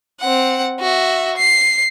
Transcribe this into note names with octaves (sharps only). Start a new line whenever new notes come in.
C4 F#5
F#4 E5
C7